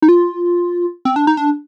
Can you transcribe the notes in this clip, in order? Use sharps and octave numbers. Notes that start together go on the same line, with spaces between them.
D#4
F4
C4
D4
D#4
D4